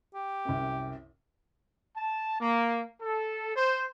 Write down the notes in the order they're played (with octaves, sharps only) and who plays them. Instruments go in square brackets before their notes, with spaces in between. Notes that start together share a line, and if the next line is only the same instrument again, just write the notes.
[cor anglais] G4
[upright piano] C2 F#2
[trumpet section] A5
A#3
A4
C5